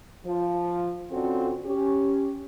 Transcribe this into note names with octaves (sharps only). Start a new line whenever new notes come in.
F3
D3 C4 C#4 F4 F#4 A4
C#4 G4